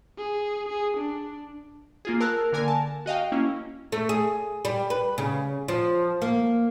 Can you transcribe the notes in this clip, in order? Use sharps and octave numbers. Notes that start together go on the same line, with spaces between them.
G#4
G#4
D4
A#3 F4 G#4
A#4 A5 E6 F#6
D3 A#3 A#4 G#5
A5
F#4 D#5 F5 G5
A#3 C#4 E4
A3
G#4
G3
B4
C#3
F3
A#3